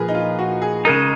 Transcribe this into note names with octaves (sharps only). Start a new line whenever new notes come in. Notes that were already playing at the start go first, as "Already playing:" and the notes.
Already playing: A#2 F3 G#4 A#4 B4
D#4
F4
F#4
G#4
C#3 G#3 D#4 A#4